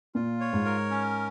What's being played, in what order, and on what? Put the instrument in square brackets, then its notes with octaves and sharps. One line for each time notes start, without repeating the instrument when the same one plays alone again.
[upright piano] A#2 [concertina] F4
[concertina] C#5
[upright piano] G#2
[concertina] A#4
C#4